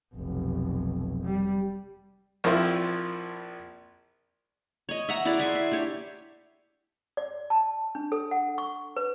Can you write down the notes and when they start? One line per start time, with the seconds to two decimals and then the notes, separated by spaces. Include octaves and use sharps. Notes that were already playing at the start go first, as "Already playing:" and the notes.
0.15 F1 B1
1.24 G3
2.44 A#1 F3 A#3 C4 E4 C6
4.89 C#5 D#5
5.08 E5 F#5 A#5
5.25 E4 F#4 G#4 D5
5.39 E5 G#5 C6
5.55 E5
5.71 D4 G4 C#5
7.17 D5
7.50 A5
7.95 D4
8.12 A4
8.31 F#5
8.58 C#6
8.97 B4